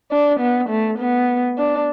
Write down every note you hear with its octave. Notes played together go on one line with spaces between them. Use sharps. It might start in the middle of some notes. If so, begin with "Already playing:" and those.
D4
B3
A3
B3
D4